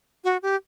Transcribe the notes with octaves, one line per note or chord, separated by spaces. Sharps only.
F#4
G4